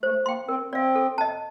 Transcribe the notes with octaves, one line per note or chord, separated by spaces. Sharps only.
A3 C5
A#3 G5 C6
C4 A#4
C4 D5 F5
A4
D#5 A5